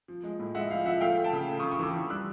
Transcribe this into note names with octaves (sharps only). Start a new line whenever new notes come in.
F3
G#3
A2
G#3 E5 F#5
F3 F5
F3 E5 F#5
A3 F5 G5
A3
G5 A5
C#3
A3
C#6 D#6
C#3
C#6 D#6
E3 D6 E6
D3
G3 E6 F#6